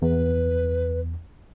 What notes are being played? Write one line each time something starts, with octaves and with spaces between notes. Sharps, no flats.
E2 B4